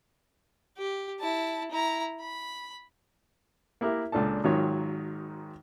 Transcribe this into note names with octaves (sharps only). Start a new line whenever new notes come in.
G4
E4 A5
E4 A#5
B5
A#3 E4 G4 A#4
C#2 A#2 D4 A4 A5
G#1 G#2 D#3 F#3 F4 C#5